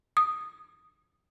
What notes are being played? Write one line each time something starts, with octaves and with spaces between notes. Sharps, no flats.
D#6